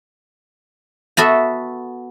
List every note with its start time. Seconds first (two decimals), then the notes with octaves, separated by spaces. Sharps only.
1.17 B3 F#4 A4 E5